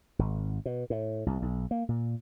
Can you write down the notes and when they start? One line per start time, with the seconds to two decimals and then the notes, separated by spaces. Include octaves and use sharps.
0.19 G#1
0.65 B2
0.90 A2
1.26 C2
1.42 B1
1.71 A#3
1.89 A#2